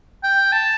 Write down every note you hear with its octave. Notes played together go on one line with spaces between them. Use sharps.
G5
A5